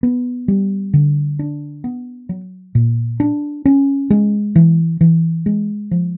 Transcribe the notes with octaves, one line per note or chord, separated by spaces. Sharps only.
B3
G3
D3
D4
B3
F#3
A#2
D4
C#4
G#3
E3
E3
G#3
F3